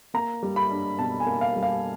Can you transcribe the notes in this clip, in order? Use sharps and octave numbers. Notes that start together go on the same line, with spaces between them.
A#3 A#5
G3
B5
D4
B2 A5
G#5
A#3
F5
G3
F5